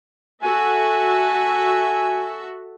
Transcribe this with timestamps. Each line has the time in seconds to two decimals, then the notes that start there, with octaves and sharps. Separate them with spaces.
0.43 F#4 A4 E5 G#5